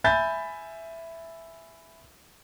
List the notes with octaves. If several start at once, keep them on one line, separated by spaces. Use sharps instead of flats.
E5 G#5 B5 G6 A6